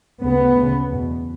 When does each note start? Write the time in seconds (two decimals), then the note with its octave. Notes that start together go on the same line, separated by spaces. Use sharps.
0.23 D2 C#3 B3
0.57 D2 C#3
0.92 E2 B2